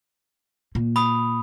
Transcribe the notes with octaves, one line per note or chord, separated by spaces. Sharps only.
A#2
B5 D#6